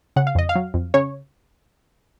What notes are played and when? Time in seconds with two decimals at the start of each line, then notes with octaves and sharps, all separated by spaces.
0.16 C#3 F#5
0.27 F5
0.35 F2 D#5
0.49 F5
0.55 F#3
0.74 F2
0.94 C#3 C#5